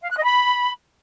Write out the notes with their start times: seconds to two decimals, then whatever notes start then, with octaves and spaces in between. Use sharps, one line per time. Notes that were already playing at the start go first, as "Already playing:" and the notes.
0.03 F5
0.10 F#6
0.17 D#5
0.25 B5